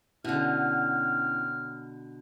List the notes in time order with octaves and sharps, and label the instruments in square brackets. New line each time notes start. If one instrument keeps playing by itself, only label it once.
[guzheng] B2 D3 [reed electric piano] C#4 E4 [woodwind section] C#5 G5 F6